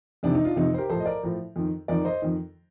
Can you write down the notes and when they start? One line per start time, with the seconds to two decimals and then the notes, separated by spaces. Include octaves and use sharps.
0.23 F2 C3 D#3 D4
0.35 D#4
0.45 D4 F4
0.56 F2 C3 D#3 D#4
0.74 C5
0.78 G4 A#4
0.90 A2 F3 A4 C5
1.00 D#5
1.06 A#4 D5
1.23 A2 F3
1.56 F2 D#3
1.88 F2 D#3 A#4 D5
2.05 C5 D#5
2.22 F2 D#3